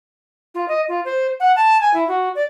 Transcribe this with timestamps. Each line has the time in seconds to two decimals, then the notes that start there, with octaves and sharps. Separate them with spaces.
0.55 F4
0.68 D#5
0.88 F4
1.05 C5
1.40 F#5
1.56 A5
1.81 G#5
1.94 E4
2.08 F#4
2.35 D5